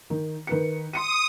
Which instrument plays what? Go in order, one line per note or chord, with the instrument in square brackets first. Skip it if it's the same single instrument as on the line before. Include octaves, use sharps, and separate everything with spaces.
[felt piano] D#3
D#3 B4 C#7
[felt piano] C6 C#7 D#7 [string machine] D#6